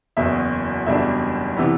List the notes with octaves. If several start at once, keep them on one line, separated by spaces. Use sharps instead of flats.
F#1 E2 B2 E5
F#1 E2 B2 G3 D4 E5
C3 E3 B3